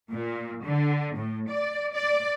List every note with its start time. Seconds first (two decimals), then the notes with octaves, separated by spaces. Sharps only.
0.13 A#2
0.65 D3
1.16 A2
1.50 D5
1.94 D5